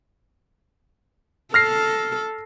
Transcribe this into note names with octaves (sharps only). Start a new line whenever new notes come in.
A4 F6 A#6 C7